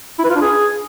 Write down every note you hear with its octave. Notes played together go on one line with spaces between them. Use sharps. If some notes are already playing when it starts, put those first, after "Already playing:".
E4
B4
F4
D4
G#4